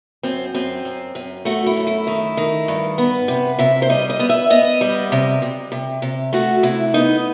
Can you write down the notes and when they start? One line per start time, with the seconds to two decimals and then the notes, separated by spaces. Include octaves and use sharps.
0.23 F#2 C4
0.54 F#2 C4
0.85 F#2
1.15 F#2
1.45 A3 F#4
1.66 E4
1.76 F#2
1.87 E4
2.07 D#3
2.37 D#3
2.68 G2
2.98 B3
3.28 C3
3.59 C3 E5
3.82 C5
3.90 G3 D#5
4.10 D#5
4.20 B3
4.29 E5
4.50 B3 D#5
4.81 G3
5.12 C3
5.42 C3
5.72 C3
6.02 C3
6.33 A3 F#4
6.63 C3 E4
6.94 B3 D#4